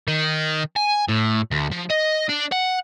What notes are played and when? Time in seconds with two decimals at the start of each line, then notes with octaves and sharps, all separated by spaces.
0.08 D#3
0.76 G#5
1.08 A2
1.51 D2
1.72 F3
1.91 D#5
2.29 D4
2.52 F#5